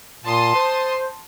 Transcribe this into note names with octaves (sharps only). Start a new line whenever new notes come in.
A#2 A5 C6 D#6
C5